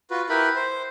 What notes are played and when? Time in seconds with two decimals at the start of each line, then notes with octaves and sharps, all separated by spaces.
0.11 F4 F#4 B4
0.29 E4 G4 A#4 B4 B5
0.55 C5